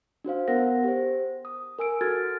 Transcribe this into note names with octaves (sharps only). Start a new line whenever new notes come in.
D4 F#4 C5 F5
B3 A#4 F#5 A#6
G4 C5
D#6
A#4 G#5 E6 D7
F#4 A4 F6 G#6 A6